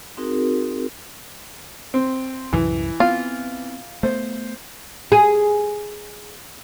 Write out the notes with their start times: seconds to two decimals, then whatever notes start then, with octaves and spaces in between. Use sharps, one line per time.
0.17 C4 D#4 F#4 G#4 A#4
1.94 C4
2.53 C2 F#2 A2 E3
3.00 B3 C4 F4
4.03 A3 B3 C5
5.12 G#4